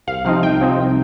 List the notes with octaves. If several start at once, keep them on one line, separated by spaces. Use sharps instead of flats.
C2 F5
C3 F3 C4 D#4 F5
C2 G5
C3 F3 C4 D#4
C2